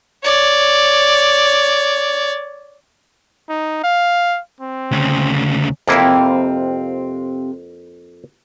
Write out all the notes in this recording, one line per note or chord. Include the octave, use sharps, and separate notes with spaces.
C#5 D5
D#4
F5
C4
D2 C#3
F2 C3 A#3 C4 E4 F4